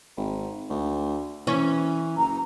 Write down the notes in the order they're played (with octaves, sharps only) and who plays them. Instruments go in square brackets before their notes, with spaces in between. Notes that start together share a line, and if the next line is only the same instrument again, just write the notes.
[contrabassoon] G#1
D2
[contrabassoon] E3 [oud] C#4
[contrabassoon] F#1 [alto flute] A#5